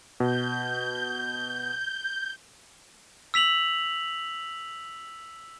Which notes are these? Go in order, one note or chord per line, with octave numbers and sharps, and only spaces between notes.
B2 G6
E6 B6 F7 F#7